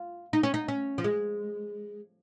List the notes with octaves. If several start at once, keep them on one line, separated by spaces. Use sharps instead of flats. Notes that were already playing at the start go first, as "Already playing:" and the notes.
Already playing: F4
D#4
C#4
D#4
C#4
F3
G#3